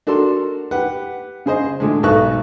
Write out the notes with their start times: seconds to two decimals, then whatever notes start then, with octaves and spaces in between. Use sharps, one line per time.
0.07 D4 F#4 A4 A#4 C6
0.71 G4 B4 F#5
1.46 C#3 G#4 C5 D#5
1.80 A2 D3 G#3
2.03 B1 G#2 D#4 A4 C#6 F#6